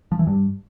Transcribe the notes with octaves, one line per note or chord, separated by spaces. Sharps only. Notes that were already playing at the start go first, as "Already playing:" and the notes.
F3
E3
G2